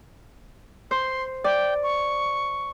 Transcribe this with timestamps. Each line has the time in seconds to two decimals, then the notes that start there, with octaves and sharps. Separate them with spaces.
0.91 C5 C6
1.44 D5 G5
1.83 C#6